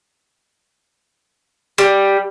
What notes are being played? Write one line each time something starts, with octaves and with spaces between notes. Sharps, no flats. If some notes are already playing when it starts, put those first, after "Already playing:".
G3